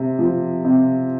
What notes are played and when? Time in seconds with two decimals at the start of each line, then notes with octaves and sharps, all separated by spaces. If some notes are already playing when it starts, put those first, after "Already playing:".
Already playing: C3
0.19 F3
0.64 C3